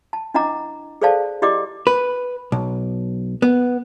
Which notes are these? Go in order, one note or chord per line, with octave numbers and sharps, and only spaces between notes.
A5
D4 E4 D#5 F#5 A#5 D6
G#4 A4 C5 D5 F5 A5
E4 G4 D5 D#5 D6
B4
B1
B3